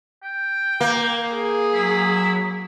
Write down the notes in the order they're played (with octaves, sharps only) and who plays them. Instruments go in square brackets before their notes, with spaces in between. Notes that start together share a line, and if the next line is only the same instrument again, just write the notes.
[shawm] G5
[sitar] A#3
[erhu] G#4
[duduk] F#3 [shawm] E4